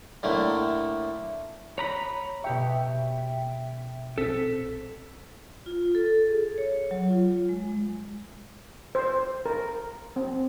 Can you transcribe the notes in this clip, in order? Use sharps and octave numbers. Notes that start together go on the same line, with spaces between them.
A2 D3 A3 A#3
C#5 A#5 B5
B2 G4 E5 G5 C#6
A#1 C4 A4 B6
F4
A4
G#4
C#5
F#3
F4
G#3
C5
A#4
C4